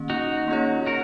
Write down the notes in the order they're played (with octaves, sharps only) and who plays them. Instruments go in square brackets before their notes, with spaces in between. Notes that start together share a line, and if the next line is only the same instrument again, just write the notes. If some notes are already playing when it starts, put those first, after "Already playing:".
Already playing: [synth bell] D#3 A#3 C#4
[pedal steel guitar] D#4 F#4
[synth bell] A#3 C#4 F4 G#4 C#5
[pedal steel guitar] F#4 A#4